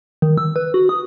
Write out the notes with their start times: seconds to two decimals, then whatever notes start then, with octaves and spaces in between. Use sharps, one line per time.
0.22 D#3
0.38 E6
0.56 B4
0.74 F#4
0.89 D#6